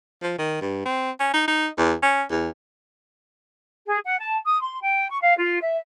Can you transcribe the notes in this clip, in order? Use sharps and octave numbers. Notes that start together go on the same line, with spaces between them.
F3
D#3
G2
C4
C#4
D#4
D#4
E2
C#4
E2
G#4
F#5
A5
D#6
C6
G5
C#6
F5
F4
E5